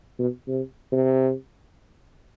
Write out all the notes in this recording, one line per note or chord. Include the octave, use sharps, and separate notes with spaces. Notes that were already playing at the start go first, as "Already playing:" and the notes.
B2
C3
C3